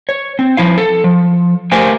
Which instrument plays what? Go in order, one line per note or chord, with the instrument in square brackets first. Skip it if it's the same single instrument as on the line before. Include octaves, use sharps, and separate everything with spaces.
[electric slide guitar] C#5
C4
F3 E4 F5
A4
F3
A3 G4 A#4 C5 F5 G#5